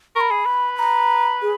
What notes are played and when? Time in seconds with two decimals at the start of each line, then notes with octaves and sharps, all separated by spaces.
0.16 A#4 C#6
0.21 B5
0.31 G#4
0.46 B4
0.76 B5
0.79 A#5
1.42 G#4